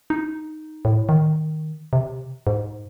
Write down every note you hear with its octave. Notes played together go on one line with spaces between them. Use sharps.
D#4
A2
D#3
C3
G#2